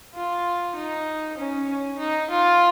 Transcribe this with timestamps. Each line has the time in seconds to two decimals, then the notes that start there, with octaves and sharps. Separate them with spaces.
0.14 F4
0.76 D#4
1.38 C#4
1.98 D#4
2.30 F4